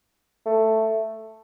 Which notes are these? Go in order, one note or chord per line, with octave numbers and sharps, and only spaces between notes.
A3